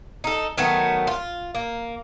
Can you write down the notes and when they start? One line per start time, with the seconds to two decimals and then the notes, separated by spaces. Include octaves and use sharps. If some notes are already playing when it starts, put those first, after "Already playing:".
0.24 D#4 A4
0.58 D#3 F#3 A3 B3
1.07 F4
1.55 A#3